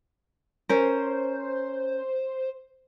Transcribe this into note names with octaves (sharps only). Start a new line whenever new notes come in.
C#4 A#4 C5